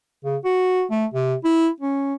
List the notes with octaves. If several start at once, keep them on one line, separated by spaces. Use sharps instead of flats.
C#3
F#4
A3
C3
E4
C#4